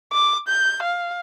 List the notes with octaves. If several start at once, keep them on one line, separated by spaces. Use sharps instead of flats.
D6
G6
F5